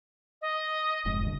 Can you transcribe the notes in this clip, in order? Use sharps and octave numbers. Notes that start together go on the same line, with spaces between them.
D#5
F1 G#2
C#2 G2 D3